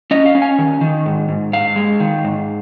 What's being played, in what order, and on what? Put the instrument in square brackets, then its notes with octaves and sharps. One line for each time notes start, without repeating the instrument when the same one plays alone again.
[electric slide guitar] C#4 D#5
F5
C#4
G#5
D#3
D#3
G#2
G#2
G#2 F5
G#3
D#3
G#2